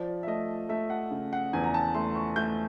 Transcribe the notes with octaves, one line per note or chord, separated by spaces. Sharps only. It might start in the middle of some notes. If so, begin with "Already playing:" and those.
Already playing: F3 D5
E5
A3 D#5
A3 E5
F#5
C#3
F#5
E2 G#5
A#5
A5
A3 C6
C#6
A3 G6